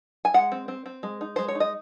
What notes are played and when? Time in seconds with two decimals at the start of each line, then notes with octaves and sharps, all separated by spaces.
0.25 G#5
0.34 G#3 F#5
0.52 C4
0.68 C4
0.86 C4
1.03 G#3
1.21 D#4
1.36 G#3 C5
1.48 C#5
1.55 D#4
1.60 D#5